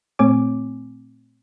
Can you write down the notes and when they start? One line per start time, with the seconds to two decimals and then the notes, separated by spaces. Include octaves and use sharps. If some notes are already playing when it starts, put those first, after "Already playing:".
0.19 A#2 A3 C4 C#5 G#5 D6